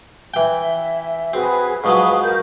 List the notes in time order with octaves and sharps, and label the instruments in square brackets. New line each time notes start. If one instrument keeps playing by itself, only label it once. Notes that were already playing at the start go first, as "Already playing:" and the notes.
[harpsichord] E3 G5
[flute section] E5
[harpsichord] C4 [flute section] F#4 G#4 B4
[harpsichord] G#2 F3 F#3 [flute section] B4 C#6 D#6
[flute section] A#4 G6